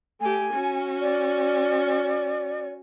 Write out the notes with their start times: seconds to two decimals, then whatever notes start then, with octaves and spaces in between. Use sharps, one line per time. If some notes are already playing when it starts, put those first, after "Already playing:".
0.20 A3 G4 G#5
0.53 C#4 F#4
1.00 D5